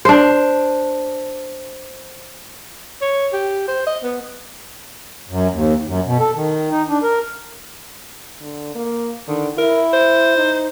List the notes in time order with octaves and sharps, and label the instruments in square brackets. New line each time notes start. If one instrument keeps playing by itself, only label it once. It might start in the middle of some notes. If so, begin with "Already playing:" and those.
[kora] D4 C5
[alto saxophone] C#5
G4
C5
D#5
B3
[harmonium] F#2
D#2
F#2
B2
A4
D#3
D#4
D4
A#4
[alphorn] D3
A#3
[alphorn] D3 [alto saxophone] D#3
[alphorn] E4 [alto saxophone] A#4
[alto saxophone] C5
[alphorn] D#4